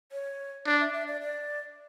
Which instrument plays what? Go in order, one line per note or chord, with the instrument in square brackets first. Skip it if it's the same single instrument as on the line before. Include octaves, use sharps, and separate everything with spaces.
[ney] C#5
[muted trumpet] D4 [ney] D5
[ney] E5
E5
D5
D5